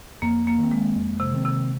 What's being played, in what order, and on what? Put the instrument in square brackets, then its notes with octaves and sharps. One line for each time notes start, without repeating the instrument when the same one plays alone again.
[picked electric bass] F2 [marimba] A#3
[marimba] A#3
[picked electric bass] D#3
C4
[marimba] G#3
[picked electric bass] F2
[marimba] C3
[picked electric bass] D#3 C4
[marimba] C3